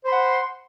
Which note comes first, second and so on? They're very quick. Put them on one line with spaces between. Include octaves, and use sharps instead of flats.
C5 C6 B5 F#5